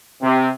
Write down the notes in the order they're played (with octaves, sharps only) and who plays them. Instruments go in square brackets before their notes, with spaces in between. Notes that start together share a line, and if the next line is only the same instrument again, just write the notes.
[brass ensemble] C3